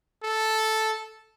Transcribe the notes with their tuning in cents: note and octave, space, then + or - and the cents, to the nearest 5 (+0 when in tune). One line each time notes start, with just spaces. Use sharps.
A4 -5